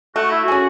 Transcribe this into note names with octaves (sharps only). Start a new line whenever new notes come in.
A3 F#4
E4
F#4
C#4 G#4